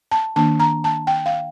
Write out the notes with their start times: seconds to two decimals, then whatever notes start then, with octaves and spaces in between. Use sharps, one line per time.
0.11 A5
0.36 D#3 A#3 D4 A5
0.60 A#5
0.84 A5
1.07 G5
1.26 F5